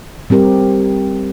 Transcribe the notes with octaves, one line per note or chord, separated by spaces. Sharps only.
G3 C4 G4 A#4